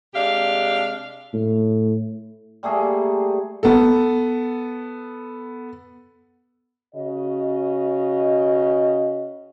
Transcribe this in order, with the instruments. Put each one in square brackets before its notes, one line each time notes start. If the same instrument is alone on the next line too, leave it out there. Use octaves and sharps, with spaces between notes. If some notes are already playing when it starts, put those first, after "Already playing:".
[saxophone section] C3 G#3 D4 G4 F5
[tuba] A2
[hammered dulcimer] G3 A3 A#3 G#4
[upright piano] B3 A4
[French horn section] C#3 F#4 D#5